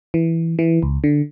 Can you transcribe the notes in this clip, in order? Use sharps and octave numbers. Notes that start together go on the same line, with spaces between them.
E3
E3
C#2
D3